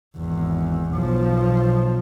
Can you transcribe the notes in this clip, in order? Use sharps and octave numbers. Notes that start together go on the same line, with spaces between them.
G#1 E2
B1 F3